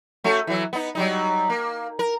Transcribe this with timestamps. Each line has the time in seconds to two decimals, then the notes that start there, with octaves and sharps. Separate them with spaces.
0.24 A3 C#4 F#4
0.47 E3 F#3
0.73 B3 D#4
0.95 F#3 G3 D#4
1.50 A#3
1.99 A#4